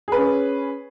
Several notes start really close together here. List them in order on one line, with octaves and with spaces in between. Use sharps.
G#4 B4 C#4